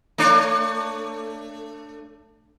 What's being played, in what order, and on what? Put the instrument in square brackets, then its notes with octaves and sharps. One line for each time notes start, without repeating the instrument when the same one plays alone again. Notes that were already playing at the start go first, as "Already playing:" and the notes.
[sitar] A3 D4 C#5